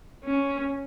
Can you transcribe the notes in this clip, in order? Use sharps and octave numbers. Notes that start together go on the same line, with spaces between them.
C#4